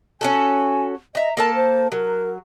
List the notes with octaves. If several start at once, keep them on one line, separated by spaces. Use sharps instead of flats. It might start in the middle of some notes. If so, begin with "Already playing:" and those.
C#4 F#4 A4 G#5
D#5 E5 A#5
A#3 A4 A#4 A5
C5
F#3 A#4